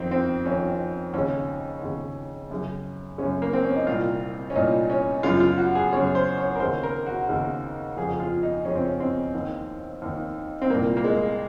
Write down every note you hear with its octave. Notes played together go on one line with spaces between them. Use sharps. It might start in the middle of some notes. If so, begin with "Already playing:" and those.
Already playing: F2 D#3 C4
C4
F2 D#3 C#4
D#2 C#3 C#4
D#2 C#3
F#2 C#3
F#2 C#3 C#4
A#3
C4
C#4
D#4
C2 A#2 F4
C#4
C2 A#2 D#4
C#4
F#2 C#3 F4
F4
F#4
G#4
F#2 C#3 C#5
C5
C#5
A#4
D#2 C#3 C5
A#4
F#4
D#2 C#3
F2 C#3 G#4
F4
D#4
F2 C#3 C#4
C4
C#4
C4
D#2 D#3
D#2 D#3
C4
C2 A#2 A#3
A#3
G#3